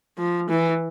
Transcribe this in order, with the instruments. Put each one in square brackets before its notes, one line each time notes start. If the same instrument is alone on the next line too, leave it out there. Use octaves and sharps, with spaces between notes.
[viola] F3
E3